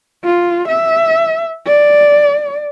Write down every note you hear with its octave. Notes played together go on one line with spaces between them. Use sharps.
F4
E5
D5